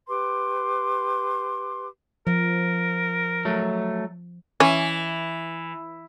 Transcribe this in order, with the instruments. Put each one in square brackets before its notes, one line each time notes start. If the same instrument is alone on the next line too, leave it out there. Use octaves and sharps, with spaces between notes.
[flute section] G4 B4 C6 D6
[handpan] F3 [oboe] A#4
[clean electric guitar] F#3 A3
[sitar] E3 [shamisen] C#4